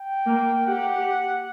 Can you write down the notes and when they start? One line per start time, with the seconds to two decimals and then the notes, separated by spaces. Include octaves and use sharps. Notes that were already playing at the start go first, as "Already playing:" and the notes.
Already playing: G5
0.27 A#3
0.66 G4 F#5